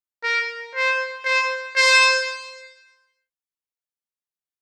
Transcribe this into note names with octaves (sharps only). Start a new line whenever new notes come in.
A#4
C5
C5
C5